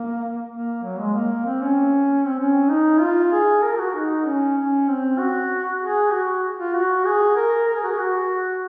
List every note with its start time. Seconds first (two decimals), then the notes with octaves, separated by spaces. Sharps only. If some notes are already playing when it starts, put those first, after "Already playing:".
Already playing: A#3
0.52 A#3
0.83 F#3
0.99 G#3
1.14 A#3
1.46 C4
1.61 C#4
2.27 C4
2.39 C#4
2.69 D#4
3.00 F4
3.32 G#4
3.63 A#4
3.78 F#4
3.94 D#4
4.26 C#4
4.57 C#4
4.88 C4
5.18 F#4
5.81 G#4
6.12 F#4
6.59 F4
6.75 F#4
7.05 G#4
7.36 A#4
7.68 A#4
7.75 G#4
7.83 F#4
7.91 G#4
7.99 F#4